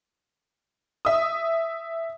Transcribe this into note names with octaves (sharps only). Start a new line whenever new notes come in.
E5 D#6